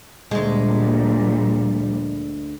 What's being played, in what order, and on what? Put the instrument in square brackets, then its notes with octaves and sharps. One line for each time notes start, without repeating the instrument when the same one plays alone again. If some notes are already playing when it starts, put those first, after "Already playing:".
[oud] D2 G#3 [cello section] A#2 F3 G3